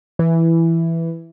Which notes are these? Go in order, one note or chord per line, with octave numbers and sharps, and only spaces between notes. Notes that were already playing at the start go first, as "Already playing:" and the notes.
E3